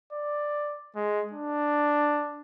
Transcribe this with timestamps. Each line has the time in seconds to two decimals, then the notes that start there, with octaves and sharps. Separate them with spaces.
0.13 D5
0.96 G#3
1.33 D4